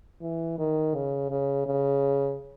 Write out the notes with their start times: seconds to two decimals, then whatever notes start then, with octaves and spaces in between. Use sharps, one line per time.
0.22 E3
0.58 D#3
0.95 C#3
1.31 C#3
1.66 C#3